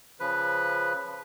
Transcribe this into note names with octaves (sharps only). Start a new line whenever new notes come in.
C#3 F3 B4